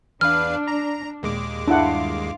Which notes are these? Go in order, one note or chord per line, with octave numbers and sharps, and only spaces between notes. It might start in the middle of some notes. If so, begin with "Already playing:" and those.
E2 D4 B4 F5 F6
A#5
D#2 A#2 G#3 D6
G2 D4 E4 F4 F5 F#5